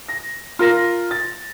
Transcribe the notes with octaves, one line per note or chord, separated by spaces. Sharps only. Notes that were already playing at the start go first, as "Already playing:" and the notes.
A#6
F4 A#4 A#6
A6